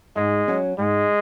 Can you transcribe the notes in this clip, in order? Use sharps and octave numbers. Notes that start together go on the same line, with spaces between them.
G#2 G#3
F#3 C#4
G#2 G#3